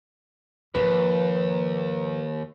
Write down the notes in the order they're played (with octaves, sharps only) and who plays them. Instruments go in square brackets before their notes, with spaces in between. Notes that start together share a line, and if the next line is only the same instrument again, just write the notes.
[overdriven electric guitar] D#2 [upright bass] G#2 F3 [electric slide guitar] B4